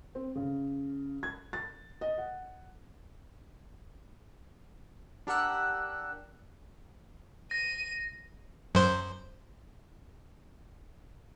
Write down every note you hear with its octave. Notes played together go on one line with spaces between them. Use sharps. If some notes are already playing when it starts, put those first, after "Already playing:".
C4
C#3
G#6
A6
D#5
F#5
D4 G4 A#4 F#5 E6 F#6
A#6 D#7
F#2 C5